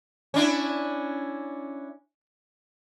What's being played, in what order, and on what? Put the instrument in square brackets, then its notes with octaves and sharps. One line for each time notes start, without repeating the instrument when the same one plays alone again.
[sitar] C#4 D4 E4